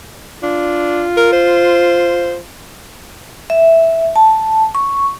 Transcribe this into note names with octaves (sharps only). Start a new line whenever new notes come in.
D4 F4
A#4
C5
E5
A5
C#6